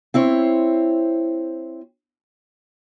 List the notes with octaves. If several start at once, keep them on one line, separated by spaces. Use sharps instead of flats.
C4 E4 C5 C#5